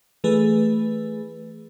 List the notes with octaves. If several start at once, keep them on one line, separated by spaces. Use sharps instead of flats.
E3 A3 G#4 B4